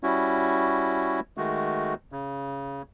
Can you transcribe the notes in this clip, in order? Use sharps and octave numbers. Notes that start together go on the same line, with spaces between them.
G3 C#4 E4 F#4
D#3 G#3 A3 F#4
C#3